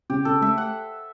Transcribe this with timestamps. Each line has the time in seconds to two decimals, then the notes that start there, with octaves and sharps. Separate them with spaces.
0.10 C#3 G4
0.25 C#3 A4
0.42 A3 E5
0.58 F#5